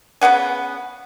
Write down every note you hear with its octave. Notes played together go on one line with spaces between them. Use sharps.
C#3 B3 F#5 G#5